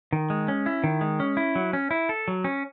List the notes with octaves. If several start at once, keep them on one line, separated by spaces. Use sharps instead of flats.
D#3
G#3
C#4
E4
D#3
G#3
C#4
E4
F#3
C#4
E4
A4
F#3
C#4